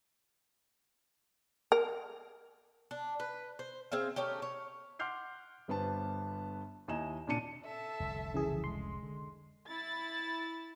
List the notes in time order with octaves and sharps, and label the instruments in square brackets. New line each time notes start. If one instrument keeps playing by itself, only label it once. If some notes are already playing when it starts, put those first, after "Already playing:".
[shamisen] A#4
[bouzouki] D4
B4
C5
C4 G#4 E5 F5
A3 C#4 D#4 G4
C#5
[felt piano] F#5 C6 D6 F6 G6 C7
G1 G2 B3 B4 C5 A5
D#2 E4 D#5 G#5 A#5 E7
A#2 C#3 D4 A5 C#7 D#7
[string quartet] A4 E5 A5
[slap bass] F1 C2 D3
[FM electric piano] C#3 E3 G#4
[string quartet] G#3 [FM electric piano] C6
[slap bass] D3
[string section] E4 A6